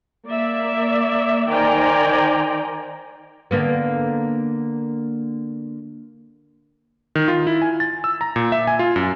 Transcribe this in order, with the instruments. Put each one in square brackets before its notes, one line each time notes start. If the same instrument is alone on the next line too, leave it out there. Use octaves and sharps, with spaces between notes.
[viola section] A#3 D5 E5
D#3 C5 D5 G5 G#5 A#5
[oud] D3 A#3 B3
[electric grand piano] D#3
F4
E4
G#5
A6
E6
A#5
A#2
E5
G#5
F4
F#2